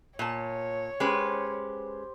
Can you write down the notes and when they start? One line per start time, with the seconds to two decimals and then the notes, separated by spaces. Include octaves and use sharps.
0.19 A#2 C#5 A5
1.00 G#3 C#4 G4 B4 C5